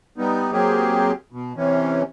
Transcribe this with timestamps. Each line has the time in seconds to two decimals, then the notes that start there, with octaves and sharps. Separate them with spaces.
0.18 G3 B3 D#4
0.52 F#3 A#3 C4 G4 G#4
1.32 B2
1.56 C3 E3 C#4